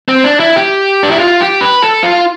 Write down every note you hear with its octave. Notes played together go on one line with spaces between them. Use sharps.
C4
D4
E4
G4
D4
E4
F4
G4
B4
A4
F4